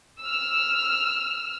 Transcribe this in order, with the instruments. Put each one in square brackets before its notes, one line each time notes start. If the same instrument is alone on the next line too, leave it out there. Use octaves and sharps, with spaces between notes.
[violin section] E6 F6